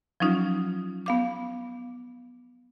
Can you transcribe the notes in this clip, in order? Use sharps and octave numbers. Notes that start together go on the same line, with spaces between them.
F3 F#3 C#4 D#4 F4
B3 F5 D6